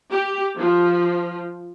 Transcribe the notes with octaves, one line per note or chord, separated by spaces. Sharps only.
G4
F3